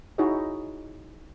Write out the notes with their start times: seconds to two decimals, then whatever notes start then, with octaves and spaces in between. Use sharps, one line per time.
0.18 D#4 E4 F#4 G#4 C#5 D#5